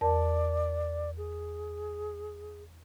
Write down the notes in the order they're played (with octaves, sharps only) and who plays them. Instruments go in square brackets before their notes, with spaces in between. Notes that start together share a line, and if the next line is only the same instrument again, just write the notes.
[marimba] E2 A#4 A5 [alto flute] D5
[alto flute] G#4